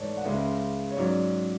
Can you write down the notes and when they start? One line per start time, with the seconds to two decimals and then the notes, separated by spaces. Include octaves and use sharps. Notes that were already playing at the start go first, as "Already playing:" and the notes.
Already playing: G#2 E3 A3 C#5 D5
0.17 F#5
0.25 C#2 C#3 G#3 C#4 E5
0.91 C#5
0.97 G#2 F#3 C#4 D5